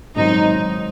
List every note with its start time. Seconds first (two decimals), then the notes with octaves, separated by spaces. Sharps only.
0.16 G#2 D#3 F#3 C4 D#4